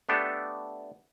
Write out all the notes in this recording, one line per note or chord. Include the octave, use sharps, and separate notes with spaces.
A3 B3 D4 G4 A4